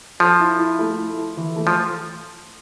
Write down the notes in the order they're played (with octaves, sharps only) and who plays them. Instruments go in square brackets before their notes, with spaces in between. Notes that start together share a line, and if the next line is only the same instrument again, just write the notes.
[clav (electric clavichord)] F3 [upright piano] A4
[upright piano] E4
E4
A3
E4
A4
E3
A3
[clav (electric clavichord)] F3